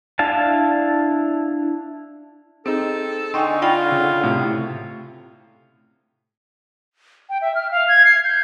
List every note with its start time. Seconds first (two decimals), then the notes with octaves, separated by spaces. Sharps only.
0.19 D4 E4 F5 A5
2.66 C4 D#4 G#4 A4
3.34 D3 D#4 G5 G#5 C6 C#6
3.62 F4 D5 G5 B5
3.92 C#3
4.24 A2 C3
7.30 G5
7.42 E5
7.55 F6
7.71 F5
7.88 G#6
8.05 C7
8.24 G6